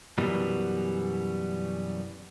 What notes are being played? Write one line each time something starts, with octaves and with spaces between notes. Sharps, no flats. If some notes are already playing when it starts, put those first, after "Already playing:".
F#2 B2 E3 G3 B3